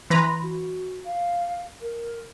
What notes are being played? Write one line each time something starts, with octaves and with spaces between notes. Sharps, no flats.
E3 B4 A#5 C6
F#4
F5
A#4